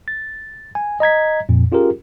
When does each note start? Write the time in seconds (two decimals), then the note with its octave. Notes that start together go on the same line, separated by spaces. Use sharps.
0.08 A6
0.75 G#5
1.00 D#5 A#5 G#6 B6
1.49 F2 A#2
1.72 C#4 F4 G4 G#4 A#4